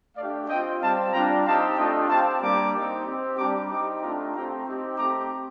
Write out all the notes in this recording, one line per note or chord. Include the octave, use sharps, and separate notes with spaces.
A3 D4 G4 D5 F5
C4 F4 D#5 G5
G3 C4 G4 F5 A5
G3 D4 F4 G5 A#5
C4 D#4 G4 F5 A5
A3 D4 F4 D#5 G5
C4 G4 F5 A5
G3 A#3 D4 A#5 D6
C4 D#4 G4
C4 G4
G3 D4 G4 A#5 D6
C4 D#4 G4 A#5 D6
A3 D4 F4 G5 A#5
A3 C4 G4 G5 A#5
C4 D#4 G4
A3 C4 G4 A#5 D6